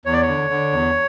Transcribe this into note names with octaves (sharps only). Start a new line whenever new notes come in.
E2 C#5
D5
C#5
D3
D3
E2